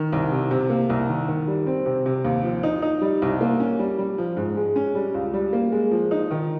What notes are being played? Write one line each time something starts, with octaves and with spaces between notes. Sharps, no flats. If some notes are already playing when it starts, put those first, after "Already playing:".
Already playing: D#3
C2
C3
C3
A#3
C2
D#3
D#3
G3
C4
C3
C3
D#2
F3
D#4
D#4
G3
C2
A#3
C#4
G3
G3
F3
G#2
G#3
C#4
G3
C#2
G3
A#3
G#3
F3
D#4
D#3